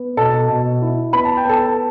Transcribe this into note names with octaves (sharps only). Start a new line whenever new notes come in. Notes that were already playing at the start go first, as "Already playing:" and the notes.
Already playing: B3
B2 A4 A5
B2
E4
B3 B5
A5
G5
B3 A4 A5